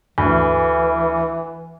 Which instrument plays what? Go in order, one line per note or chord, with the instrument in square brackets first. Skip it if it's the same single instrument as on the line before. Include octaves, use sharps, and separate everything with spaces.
[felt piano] D2 [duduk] E3